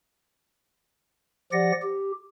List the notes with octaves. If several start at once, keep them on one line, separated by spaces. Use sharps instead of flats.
F3 G4 D5 F#5 A#6
G4